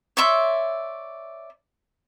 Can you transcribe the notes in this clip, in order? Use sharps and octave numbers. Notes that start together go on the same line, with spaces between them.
C#5 D5 E5 C6